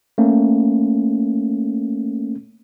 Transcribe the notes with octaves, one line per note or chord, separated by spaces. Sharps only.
A3 A#3 C#4